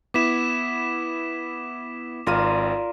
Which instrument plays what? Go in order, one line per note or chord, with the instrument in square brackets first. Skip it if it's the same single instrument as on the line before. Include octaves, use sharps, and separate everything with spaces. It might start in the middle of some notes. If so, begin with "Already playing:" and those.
[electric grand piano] B3 E4 [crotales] D6 B6 E7
[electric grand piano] G#1 D#7 [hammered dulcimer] F4 A#4 D5